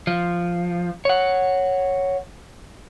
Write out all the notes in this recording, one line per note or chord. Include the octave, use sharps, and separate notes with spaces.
F3
C#5 F#5